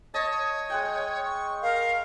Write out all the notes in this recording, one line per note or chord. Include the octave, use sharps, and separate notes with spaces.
C#5 D#5 A5
C#5
G#3 F#5 G5
C#6
A#4 F5